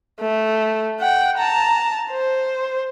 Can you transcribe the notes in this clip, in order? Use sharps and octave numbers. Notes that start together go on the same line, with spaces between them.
A3
F#5 G5
A5 A#5
C5